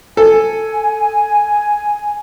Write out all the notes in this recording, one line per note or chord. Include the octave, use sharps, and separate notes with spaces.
A4 G#5